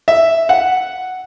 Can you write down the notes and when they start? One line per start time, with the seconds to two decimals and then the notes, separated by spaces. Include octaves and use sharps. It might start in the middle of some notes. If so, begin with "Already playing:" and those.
0.08 E5
0.49 F#5